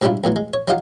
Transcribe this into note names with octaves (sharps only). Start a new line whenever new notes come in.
G#2 F#3 G3 D4 E4 F4
E2 A2 E3 F#3
G#3
C#5
F#3 D#4 F4 G4 F5 F#5